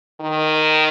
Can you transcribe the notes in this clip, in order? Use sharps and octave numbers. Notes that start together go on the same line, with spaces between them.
D#3